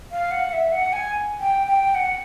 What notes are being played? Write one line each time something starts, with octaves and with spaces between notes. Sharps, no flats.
F5
F#5
E5
F#5
G#5
G5
G5
F#5